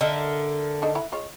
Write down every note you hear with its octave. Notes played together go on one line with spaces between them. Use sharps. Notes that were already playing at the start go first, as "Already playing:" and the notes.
D3 A#4 D#5 E5
D4 D#4 A4
E4 F#5 B5
G#3 F4 C#5